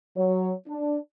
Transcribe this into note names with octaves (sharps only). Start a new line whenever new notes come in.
F#3 C#5
D4